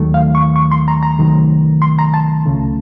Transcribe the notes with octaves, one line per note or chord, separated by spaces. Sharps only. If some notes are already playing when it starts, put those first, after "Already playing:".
Already playing: D#2 D#3 F#3 A3
F5
C#6
C#6
C6
A#5
A#5
C2 C3 D#3 F#3 A3
C6
A#5
A5
C#2 C#3 A3